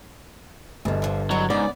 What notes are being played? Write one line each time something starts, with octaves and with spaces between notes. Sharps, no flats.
G1 E2 G2 B2
D3 E3 F3
D3 F#3 G#3 E4
G#2 C#3 B3 D5